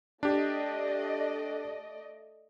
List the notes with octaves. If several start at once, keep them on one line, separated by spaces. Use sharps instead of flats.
A3 D4 G4 D5 D#5